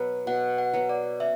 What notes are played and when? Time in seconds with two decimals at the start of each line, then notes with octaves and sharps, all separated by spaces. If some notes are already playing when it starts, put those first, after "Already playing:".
Already playing: B2 F#3 B3
0.27 B2 F#5
0.58 F#5
0.73 F#3 B3
0.89 D5
1.20 C#4 E5